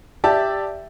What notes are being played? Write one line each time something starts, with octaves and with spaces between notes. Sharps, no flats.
G4 D5 E5 A5